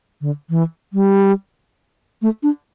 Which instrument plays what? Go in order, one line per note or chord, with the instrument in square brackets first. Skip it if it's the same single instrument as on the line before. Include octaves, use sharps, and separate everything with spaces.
[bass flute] D3
E3
G3
A3
D4